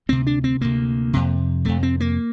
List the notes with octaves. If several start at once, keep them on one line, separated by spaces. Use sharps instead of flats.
D2 C3 C4
D4
C4
D2 C3 A#3
F2 C3
F2 C3 A3
C4
A#3